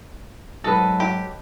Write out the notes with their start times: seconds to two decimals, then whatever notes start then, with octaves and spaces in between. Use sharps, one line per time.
0.64 G#2 F#3 A4 B4 D#5
1.00 G4